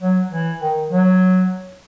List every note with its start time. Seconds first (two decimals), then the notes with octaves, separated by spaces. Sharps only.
0.01 F#3
0.31 E3
0.61 D#3
0.91 F#3